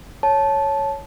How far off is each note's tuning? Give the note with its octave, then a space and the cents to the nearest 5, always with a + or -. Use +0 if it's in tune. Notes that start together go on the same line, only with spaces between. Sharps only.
C#5 +0 A5 -15